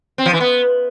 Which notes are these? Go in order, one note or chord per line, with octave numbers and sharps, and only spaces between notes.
C4
F3
E3
B3